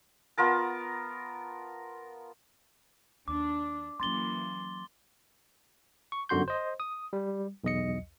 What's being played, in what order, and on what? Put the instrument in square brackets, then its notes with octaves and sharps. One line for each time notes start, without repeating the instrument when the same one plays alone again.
[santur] B3 F4 A#4 A5
[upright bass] D#2 [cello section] D4 [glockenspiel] D6
[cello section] E3 A#3 [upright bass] F#3 C#4 [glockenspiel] C6 A6 G7
[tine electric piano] C#6
G1 F#2 D3 F#4 C6 G6
C5 D#5
D#6
G3
B1 E2 D#5 C#7